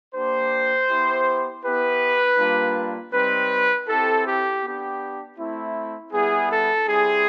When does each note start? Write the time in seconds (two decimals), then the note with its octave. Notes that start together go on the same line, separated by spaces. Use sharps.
0.14 A#3 D4 G4 C5
0.89 B3 E4 G4
1.63 B3 E4 G4 B4
2.38 G3 A#3 D4 F4
3.13 G3 C4 D#4 B4
3.88 C4 E4 G4 A4
4.25 G4
4.62 B3 D4 G4
5.38 A3 C4 E4
6.12 G3 B3 E4 G#4
6.50 A4
6.87 G3 C4 E4 G#4